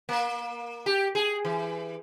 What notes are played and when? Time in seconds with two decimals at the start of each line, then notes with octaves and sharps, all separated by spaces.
0.09 A#3
0.86 G4
1.15 G#4
1.45 E3